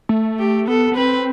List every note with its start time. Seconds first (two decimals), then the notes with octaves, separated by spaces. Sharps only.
0.09 A3
0.39 G4
0.68 B3 A4
0.92 B3
0.96 C4 B4